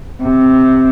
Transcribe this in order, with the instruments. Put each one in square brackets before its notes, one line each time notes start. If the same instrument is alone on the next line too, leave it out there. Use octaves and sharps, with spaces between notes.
[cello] C3